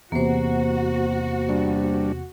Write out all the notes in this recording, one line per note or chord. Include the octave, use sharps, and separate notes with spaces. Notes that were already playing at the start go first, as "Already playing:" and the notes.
E2 C3 A#3 F#4 C5
G3 D4